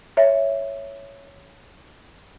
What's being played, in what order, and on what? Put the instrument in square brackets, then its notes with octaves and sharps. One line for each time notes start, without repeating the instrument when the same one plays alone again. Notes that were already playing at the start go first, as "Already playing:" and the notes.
[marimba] C#5 E5